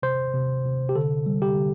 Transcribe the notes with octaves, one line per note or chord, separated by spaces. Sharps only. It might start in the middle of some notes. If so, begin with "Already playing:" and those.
C3 C5
C3
C3
G4
D3 A4
G3
G4
D3